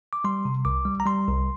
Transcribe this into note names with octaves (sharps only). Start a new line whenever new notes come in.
D6
G3 C6
C3
C2 D6
G3
A#5
G3 C6
C2